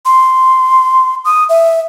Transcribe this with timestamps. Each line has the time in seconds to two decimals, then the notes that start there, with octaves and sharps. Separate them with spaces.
0.05 C6
1.25 D#6
1.49 E5